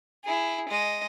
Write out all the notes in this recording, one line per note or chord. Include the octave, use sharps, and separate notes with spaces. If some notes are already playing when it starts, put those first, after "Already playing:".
E4 G#4
G#3 D#5